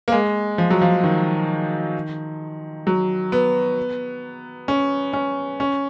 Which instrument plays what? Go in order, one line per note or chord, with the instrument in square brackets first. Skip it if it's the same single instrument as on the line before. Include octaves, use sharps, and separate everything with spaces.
[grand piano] A#3
G#3
F3
F#3
F3
D#3
F#3
B3
C#4
C#4
C#4